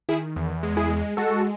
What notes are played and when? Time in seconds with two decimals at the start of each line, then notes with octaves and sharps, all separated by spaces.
0.09 D#3 E4 G#4
0.36 E2
0.63 G#3
0.77 E4 G#4
0.90 G#3
1.17 G#3 F#4 A4